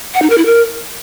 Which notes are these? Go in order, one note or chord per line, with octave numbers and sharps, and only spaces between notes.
F#5
D#4
A#4
E4
A#4